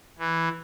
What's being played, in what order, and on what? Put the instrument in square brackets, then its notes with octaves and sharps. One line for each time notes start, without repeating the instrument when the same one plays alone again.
[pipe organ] E3